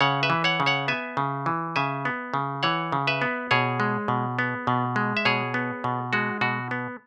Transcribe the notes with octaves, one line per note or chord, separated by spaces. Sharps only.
C#3 C#5 F#5
B4 E5
E3
C#5 F#5
C#3
C#5 F#5
B3 E5 G#5
C#3
E3
C#3 E5 G#5
B3
C#3
E3 C#5 F#5
C#3
B4 E5
B3
B2 G#4 C#5
G#3
B2
B3
B2
G#3
E5
B2 G#4 C#5
B3
B2
G#3 F#4
B2 F#4
B3